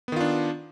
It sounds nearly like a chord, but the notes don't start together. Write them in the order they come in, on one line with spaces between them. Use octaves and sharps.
B3 D#3 F4 D4